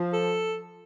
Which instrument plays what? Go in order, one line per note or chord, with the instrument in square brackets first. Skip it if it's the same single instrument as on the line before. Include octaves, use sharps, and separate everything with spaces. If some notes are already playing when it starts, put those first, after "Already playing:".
Already playing: [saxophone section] F3
[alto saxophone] A4